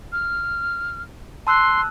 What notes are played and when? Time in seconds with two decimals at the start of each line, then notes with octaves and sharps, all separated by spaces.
0.12 F6
1.47 A5 C6 E6 F#6